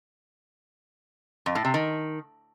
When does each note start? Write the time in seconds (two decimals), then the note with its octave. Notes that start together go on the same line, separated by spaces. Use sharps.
1.46 F2
1.55 A2
1.65 C3
1.74 D#3